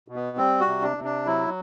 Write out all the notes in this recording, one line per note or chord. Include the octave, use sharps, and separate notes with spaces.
B2
B3
G3 C4
F#4
C3
D4
C3
D4
F#3 E4